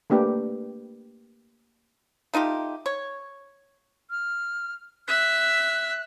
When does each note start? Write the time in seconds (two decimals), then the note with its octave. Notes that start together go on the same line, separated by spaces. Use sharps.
0.10 A3 A#3 D4 G4 B4
2.34 A3 D#4 F4 G4
2.86 C#5
4.10 F6
5.08 E5 F#6